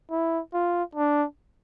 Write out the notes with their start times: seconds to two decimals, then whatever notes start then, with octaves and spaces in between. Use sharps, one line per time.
0.11 E4
0.53 F4
0.95 D4